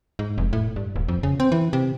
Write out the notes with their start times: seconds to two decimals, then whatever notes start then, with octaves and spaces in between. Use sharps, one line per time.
0.19 G#2
0.38 F1
0.53 A2
0.76 G2
0.96 D1
1.08 F2
1.23 C#3
1.40 C4
1.52 E3
1.73 C3